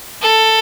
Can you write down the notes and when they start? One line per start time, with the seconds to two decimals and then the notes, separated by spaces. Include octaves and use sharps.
0.22 A4